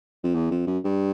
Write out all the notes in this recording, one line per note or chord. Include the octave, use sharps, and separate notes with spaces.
F2
E2
F2
F#2
G2